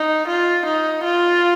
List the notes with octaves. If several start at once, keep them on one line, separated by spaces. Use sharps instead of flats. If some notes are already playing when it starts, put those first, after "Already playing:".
Already playing: D#4
F4
D#4
F4